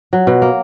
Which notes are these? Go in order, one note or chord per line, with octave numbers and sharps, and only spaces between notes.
F#3
B2
A#3